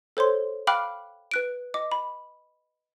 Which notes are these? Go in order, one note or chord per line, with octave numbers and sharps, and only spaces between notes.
A4 C5 C#5 C6
F5 G5 B5 D6 F6 F#6
B4 F#6 D7
D#5 D6
B5